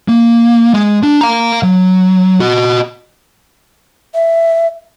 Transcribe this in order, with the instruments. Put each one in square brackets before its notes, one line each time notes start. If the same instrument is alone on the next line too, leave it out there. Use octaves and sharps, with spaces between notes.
[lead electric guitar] A#3
G#3
D4
F5 A#5
F#3
F#4 D#5
[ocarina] E5